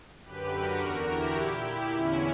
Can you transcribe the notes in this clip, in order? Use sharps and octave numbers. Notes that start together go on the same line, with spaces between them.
F#2 D3 G4 B4
F#4 A#4
E2 D3 F#4 A#4
E4 G4
A#2
E2 D3 C#4 E4